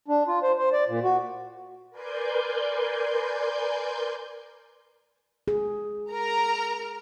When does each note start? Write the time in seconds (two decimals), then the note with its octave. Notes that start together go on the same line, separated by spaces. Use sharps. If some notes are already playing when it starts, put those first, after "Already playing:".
0.08 D4
0.28 F4
0.43 C5
0.58 C5
0.73 D5
0.89 A#2
1.04 F#4
1.90 A#4 B4 D5 G#5 C6 G6
5.48 G#4
6.09 A#4 A#5